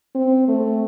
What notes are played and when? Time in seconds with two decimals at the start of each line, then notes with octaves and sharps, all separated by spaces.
0.15 C4
0.48 A3